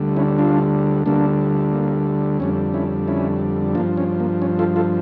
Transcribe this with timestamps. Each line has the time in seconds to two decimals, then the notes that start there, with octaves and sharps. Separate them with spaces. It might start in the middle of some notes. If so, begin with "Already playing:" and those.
Already playing: D2 D3 G3
0.16 C#4 E4
0.38 D4 F4
1.06 D2 D3 G3 A#3 D4
1.73 A#3
2.40 F2 D3 G3 C#4
2.74 C#4 E4
3.08 C#4 E4
3.75 G2 F3 A#3 D4
3.97 C#4
4.20 A#3
4.42 C#4
4.59 F4 A4
4.76 F4 A4